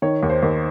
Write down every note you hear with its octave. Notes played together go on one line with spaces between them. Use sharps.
D#3 C#5
D#2
C5
D#2